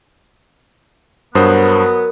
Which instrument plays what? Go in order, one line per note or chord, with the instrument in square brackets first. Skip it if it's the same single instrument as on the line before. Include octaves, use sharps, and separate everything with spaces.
[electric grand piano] G2 C5 D#6 [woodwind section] F#3 B3 [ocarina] A#4